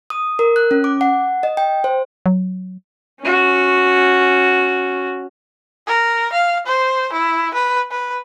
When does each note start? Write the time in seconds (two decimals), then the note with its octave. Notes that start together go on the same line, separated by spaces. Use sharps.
0.10 D#6
0.39 A#4
0.56 F#6
0.71 C#4
0.84 D6
1.01 F#5
1.43 D#5
1.57 G5
1.84 C5
2.26 F#3
3.21 C#4 F#4
5.87 A#4
6.32 F5
6.66 C5
7.12 E4
7.54 B4
7.91 B4